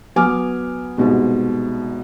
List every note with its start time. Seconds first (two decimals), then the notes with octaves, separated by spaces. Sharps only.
0.16 F#3 B3 G#5 D6 F6
0.98 C2 G#2 B2